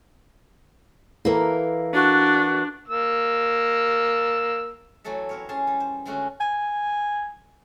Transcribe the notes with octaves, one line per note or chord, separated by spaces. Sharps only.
E3 A#3 E4 A4 A#4
D4 F#4
A#3 E6
E3 F#3 A3 A4 E5
C4 A#4 C#5
C#4 G#4 A5 C6
G3
C5
D3 G#3 A3 C#4 F#4
G#5